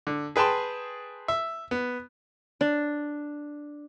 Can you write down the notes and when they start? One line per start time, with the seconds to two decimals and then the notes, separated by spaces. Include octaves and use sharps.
0.07 D3
0.36 G#4 B4 G5 A5 C6
1.28 E5
1.71 B3
2.61 D4